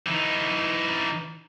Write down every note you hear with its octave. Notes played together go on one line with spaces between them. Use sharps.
E3 D#4